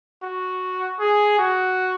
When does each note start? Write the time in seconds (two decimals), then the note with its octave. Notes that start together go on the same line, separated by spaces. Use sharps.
0.23 F#4
0.99 G#4
1.39 F#4